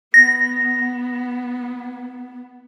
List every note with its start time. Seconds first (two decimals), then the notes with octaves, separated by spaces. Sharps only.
0.14 B3 A#6